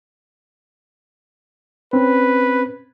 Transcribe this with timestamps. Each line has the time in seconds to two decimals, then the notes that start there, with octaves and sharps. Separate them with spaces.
1.93 C4 C#4 B4